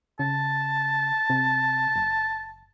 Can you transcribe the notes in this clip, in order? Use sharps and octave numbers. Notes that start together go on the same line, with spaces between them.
C#3 A5
C3
F#1